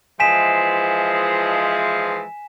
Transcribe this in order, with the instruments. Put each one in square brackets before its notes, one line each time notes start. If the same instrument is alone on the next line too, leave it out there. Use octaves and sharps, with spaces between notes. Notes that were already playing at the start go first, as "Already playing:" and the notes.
[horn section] E3 F3 G#3 [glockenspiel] G#5 B6 E7